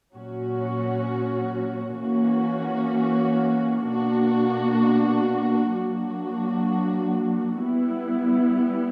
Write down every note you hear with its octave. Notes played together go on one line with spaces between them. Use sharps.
A#2 F#3 C#4 F#4
E3 A#3 C#4 F#4
B2 A#3 D4 F#4
F#3 A#3 D4 F#4
G3 B3 E4